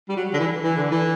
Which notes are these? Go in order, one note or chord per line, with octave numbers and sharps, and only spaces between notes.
G3
F#3
D3
E3
E3
D3
E3